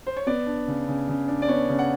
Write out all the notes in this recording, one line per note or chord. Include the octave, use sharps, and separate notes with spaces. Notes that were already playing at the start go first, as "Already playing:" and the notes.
C5
C#5
B3 D5
D4
C#3
C#3
C#3
D4
D5
B3 C#5
C#3
F#5